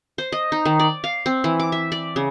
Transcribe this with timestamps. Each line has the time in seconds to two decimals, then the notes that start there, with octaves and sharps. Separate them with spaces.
0.18 C5
0.32 D#5
0.52 D#4
0.65 D#3
0.80 D5
1.04 F5
1.26 C4
1.44 E3
1.60 D6
1.72 E5
1.92 D5
2.16 C#3